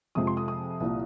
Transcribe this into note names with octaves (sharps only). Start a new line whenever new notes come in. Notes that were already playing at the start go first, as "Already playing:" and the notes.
F2 C3 F3 G#3 D#6
C6
D#6
D#6
C2 A#2 F3